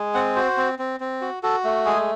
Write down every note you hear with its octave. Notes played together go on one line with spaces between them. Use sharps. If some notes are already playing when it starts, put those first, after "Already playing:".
Already playing: G#3
C4 F#5
F#4 C5
C4
C4
C4
F#4
F#4 A4
A3
G#3 G#4